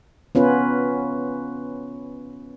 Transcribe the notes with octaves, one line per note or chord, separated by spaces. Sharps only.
B3 C#4 F4 B4